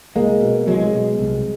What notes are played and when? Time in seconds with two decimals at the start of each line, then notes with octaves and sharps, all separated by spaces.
0.15 C2 G#3 A#3
0.41 B2
0.67 C2 F#3 G#3
0.93 B2
1.19 C2